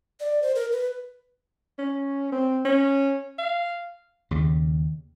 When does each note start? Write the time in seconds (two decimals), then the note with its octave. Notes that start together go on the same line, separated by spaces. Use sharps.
0.20 D5
0.42 C5
0.55 A#4
0.72 B4
1.79 C#4
2.32 C4
2.65 C#4
3.38 F5
4.31 D#2 C#3